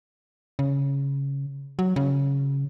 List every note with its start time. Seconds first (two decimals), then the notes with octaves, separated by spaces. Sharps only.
0.59 C#3
1.79 F#3
1.96 C#3